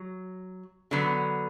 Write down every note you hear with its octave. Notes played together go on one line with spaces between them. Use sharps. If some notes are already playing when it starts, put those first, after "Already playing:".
Already playing: F#3
D3 F#3 B3